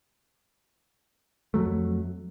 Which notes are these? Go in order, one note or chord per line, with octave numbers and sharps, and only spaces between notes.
F2 F#3 A3